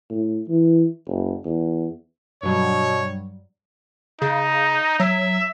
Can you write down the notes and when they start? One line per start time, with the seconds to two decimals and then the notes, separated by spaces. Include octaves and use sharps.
0.10 A2
0.49 E3
1.07 F#1
1.45 E2
2.43 G2 B2 F#3 G3 C#5
4.22 C#3 D#4
5.00 F#3 E5